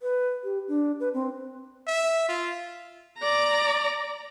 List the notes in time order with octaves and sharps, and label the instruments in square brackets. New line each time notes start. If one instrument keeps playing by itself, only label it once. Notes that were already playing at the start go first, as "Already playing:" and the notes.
[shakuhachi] B4
G4
D4
B4
C4
[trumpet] E5
F4
[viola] D5 A#5